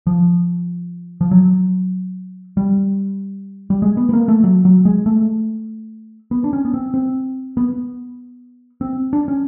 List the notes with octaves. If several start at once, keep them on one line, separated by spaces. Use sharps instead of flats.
F3
F3
F#3
G3
G3
G#3
B3
B3
A#3
A3
F#3
F#3
G#3
A3
B3
D4
C#4
B3
C4
C4
B3
C4
D4
C#4